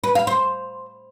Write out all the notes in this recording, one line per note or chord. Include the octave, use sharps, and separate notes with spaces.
B4
F5
C5